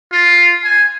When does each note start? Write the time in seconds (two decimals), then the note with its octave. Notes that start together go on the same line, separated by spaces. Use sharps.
0.12 F4
0.64 G#5